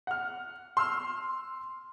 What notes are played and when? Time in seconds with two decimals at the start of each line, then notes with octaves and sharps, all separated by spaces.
0.07 F#5 F6
0.77 C6 E6 F6